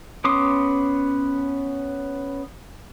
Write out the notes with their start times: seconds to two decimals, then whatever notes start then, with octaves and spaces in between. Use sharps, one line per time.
0.24 B3 C#4 C6 D6 D#6